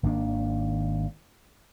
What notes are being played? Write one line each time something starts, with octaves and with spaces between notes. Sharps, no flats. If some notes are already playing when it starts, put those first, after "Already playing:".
G#1 D#3 A#3 D4